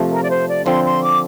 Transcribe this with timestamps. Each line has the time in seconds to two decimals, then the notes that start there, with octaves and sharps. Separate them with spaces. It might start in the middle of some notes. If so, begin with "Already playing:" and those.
Already playing: C3 F3 A3
0.11 A#4
0.23 D5
0.29 C5
0.48 D5
0.66 D3 F3 C4 C6
0.84 C6
1.03 D6